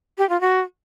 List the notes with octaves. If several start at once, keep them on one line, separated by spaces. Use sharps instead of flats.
G4
F4
F#4